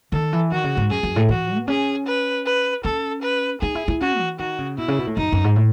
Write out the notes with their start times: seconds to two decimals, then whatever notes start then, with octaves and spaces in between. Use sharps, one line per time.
0.12 D#3 A4
0.33 E3
0.51 D#3 F#4
0.64 C#3
0.77 G#2
0.91 F#2 G#4
1.03 F#2
1.16 A2
1.29 E3 F#4
1.57 B3
1.68 C#4 G#4
2.07 B4
2.46 B4
2.85 C#4 A4
3.23 B4
3.62 D#4 G#4
3.75 E4
3.88 E4
4.01 C#4 F#4
4.20 E3
4.39 D#3 F#4
4.59 C#3
4.78 B2 E4
4.88 C#3
4.99 B2
5.07 A2
5.17 F#2 D#4
5.32 F#2
5.44 G#2
5.56 A2